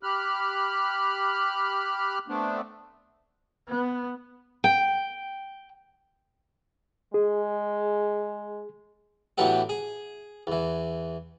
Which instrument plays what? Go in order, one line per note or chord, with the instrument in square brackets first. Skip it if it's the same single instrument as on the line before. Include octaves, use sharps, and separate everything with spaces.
[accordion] G4 B5 F6 F#6
A3 B3 C4 D4
[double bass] B3
[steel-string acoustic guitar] G5
[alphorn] G#3 [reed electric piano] G#4
[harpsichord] A2 E3 F#3 B3 D4 G4
G#4
E2 E3